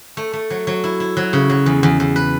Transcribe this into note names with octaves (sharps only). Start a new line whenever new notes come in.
A3
A3
F#3
F#3
E4
E4
F#3
C#3
F#3
E2
E2
E2
B4